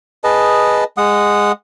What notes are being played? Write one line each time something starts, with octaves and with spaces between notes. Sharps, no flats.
G#4 B4 D#5 A5
G#3 F#5 D#6